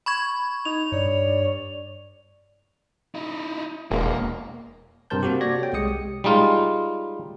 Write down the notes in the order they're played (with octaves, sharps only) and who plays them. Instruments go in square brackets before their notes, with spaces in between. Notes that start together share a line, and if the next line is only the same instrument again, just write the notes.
[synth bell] B5 C#6 G#6
[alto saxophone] D#4 [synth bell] F7
[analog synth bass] G2 [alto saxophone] C#5 [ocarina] D5
[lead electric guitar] D#4 E4
[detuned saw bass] E1 [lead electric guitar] A#3
[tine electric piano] G2 C3 A#4 C5 A5 G6
A#3 C4 F#4 G4
F#4 A4 D5 G#6 A#6
C#5 G5
C2 G#3 G4 D#6 C#7
[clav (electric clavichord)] G3 G#3 D#4 F4